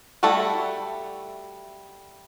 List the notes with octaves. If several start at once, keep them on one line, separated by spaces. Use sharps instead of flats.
G3 A3 E4 F#4 A4